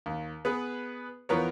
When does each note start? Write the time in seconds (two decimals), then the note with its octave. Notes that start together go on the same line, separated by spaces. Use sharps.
0.06 D#2
0.45 B3 G#4 B4
1.29 E2 F3 B3 A#4 C#5